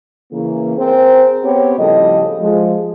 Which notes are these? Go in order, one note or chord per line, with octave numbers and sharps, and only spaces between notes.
C#3 E3 A#3
C4 G#4 A#4 C5
B3 C4 G4 C#5
A2 C#3 F3 G3 A4 D#5
F3 G#3